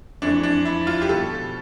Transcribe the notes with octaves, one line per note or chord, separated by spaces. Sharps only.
F2 E3 A3 D4
D4
E4
F4
G4
B2 G3 A4